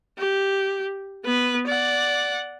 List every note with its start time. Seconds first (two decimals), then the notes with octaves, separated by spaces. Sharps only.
0.18 G4
1.24 B3 B4
1.67 D5 F#5